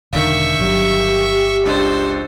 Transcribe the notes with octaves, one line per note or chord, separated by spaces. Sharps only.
E1 D3 D#3 D4 E5 F5 C#6
G1 F#3 G4
C#2 D4 A4 C5 D#5